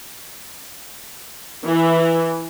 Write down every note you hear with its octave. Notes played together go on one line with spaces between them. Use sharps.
E3